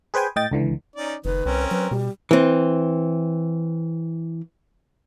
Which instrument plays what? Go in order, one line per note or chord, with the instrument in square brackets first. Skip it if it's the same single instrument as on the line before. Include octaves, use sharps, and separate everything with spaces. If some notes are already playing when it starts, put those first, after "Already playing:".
[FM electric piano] G#4 B4 C5 G5 G#5
A2 D#5 G5 A6
C#2 D3 E3
[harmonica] C#4 D#4 D5
[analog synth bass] F#1 [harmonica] D#3 [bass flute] B4
[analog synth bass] C2 [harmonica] C4 C#4 A#4
[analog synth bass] F#3 [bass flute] B4
[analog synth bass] B2 [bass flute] G3
[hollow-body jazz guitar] E3 C4